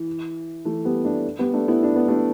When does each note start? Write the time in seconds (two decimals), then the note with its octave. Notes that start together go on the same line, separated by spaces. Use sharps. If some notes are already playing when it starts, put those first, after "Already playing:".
Already playing: E3
0.65 E3 A3
0.85 G3 B3
1.05 A3 D4
1.39 G3 B3
1.53 A3 D4
1.68 B3 E4
1.83 D4
1.96 B3
2.08 A3 D4